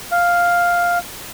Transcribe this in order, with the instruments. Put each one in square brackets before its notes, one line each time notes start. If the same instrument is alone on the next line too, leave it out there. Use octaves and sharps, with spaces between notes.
[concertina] F5